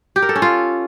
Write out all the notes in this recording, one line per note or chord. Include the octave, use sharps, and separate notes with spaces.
G4
A#4
A4
C#4
F4